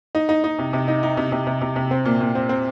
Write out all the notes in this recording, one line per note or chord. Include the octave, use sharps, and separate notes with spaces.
D#4
D#4
D#4
C3
C3
D#4
D#4
C3
C3
C3
C3
C3
C4
A#2
A#2
C4
C4